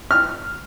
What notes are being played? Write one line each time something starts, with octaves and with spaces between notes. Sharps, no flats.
F6